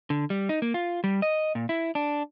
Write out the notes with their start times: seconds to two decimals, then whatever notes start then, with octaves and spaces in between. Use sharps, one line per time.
0.10 D3
0.30 G3
0.49 D#4
0.62 A#3
0.74 F4
1.04 G3
1.22 D#5
1.55 A#2
1.69 E4
1.95 D4